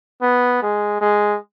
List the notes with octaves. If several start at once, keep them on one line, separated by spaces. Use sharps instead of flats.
B3
G#3
G#3